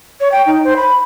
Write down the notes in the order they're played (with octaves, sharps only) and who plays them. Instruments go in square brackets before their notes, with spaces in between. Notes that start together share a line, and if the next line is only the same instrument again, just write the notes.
[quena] C#5
G5
D#4
C5
B5